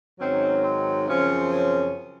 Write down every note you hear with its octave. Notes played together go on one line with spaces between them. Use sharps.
G#2 D#3 F#3 C4 C#4
C4
F#2 C#3 F3 C4 C#4
C#4